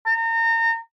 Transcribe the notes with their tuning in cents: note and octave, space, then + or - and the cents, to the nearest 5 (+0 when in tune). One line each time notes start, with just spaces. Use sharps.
A#5 -35